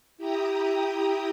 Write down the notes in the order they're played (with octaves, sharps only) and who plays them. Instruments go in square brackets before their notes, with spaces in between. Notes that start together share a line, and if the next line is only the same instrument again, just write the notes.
[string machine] E4 G4 G5 A#5 D#6